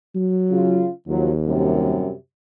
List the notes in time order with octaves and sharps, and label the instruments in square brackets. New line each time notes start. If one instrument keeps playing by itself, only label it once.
[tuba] F#3
[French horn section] C#3 F4
[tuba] D#2 [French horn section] F3 F#3
[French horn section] F#2 C3 G3